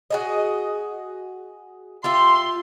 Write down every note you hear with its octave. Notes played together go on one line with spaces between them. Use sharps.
F#4 G#4 D#5
F4 G4 E5 C6